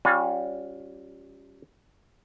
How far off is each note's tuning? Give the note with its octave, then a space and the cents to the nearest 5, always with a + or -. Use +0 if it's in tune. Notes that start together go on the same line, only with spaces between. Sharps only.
G3 +5 C#4 +0 F4 +40